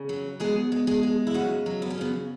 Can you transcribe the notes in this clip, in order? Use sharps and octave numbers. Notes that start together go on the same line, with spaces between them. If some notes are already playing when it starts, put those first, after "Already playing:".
Already playing: C#3
F#3
B2 G#3 G#4
G#3
G#3 G#4
G#3
E4
C#3 F#3 F#4
F#3
B3
C#4
C#3 B3